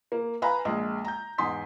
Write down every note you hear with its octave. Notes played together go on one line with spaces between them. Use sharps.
A#3
B4 F5 G#5 A#5 B5
A#1 G#3
A#5 G6
E2 G#2 G#5 C6 D#6 B6